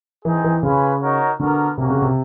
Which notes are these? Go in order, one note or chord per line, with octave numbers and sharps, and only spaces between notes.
E3 C4 D#4 G#4
E3
C#3 C#4 F4 G#4 B4
D#4 F#4 A#4 C#5
D3 B3 D4 F#4 A#4
C3 A#3 C#4 F#4
C#3
C3